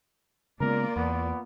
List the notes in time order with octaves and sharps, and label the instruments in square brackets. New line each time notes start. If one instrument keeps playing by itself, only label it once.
[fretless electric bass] C#3 G#3 B3 [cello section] A#3 F4 D5 [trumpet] A#4
[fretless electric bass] E2 [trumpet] B3